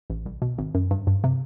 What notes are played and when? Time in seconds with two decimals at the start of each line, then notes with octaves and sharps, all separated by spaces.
0.10 A1
0.26 C2
0.42 B2
0.58 G#1
0.75 F#2
0.91 G2
1.07 G2
1.24 C3